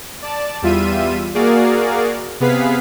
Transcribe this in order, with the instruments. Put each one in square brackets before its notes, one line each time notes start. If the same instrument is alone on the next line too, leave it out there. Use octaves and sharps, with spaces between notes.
[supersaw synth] D5 A5
E2 G3 F4 E5 D#7
A#3 F#4 G#4 A#4 D5 F5
C3 B3 G#4 B4 F5 B6